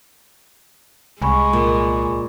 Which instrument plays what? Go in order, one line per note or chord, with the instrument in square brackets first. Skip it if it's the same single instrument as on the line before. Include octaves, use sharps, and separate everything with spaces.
[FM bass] C2 [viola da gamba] G#3 [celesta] G#5 B5 C#6
[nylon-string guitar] A#2